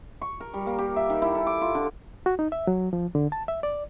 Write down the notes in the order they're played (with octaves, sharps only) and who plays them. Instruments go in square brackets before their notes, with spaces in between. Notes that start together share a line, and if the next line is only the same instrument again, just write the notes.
[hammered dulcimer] C#6
A#4
G3
A#3
G4
E5
D#3
E4
A4
D6
F4
D3
[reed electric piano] F#4
D#4
E5
F#3
F3
D3
A5
E5
D5